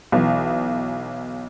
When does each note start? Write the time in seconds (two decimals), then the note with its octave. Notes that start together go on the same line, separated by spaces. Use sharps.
0.12 B1 E3